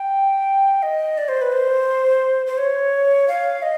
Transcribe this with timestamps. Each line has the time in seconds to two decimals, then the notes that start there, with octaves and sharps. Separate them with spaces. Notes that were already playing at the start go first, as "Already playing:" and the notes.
Already playing: G5
0.83 D#5
1.18 D5
1.29 C5
1.41 B4
1.52 C5
2.47 C5
2.58 C#5
3.28 F5
3.62 D#5